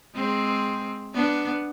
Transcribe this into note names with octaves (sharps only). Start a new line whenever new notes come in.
G#3 C4
B3 D4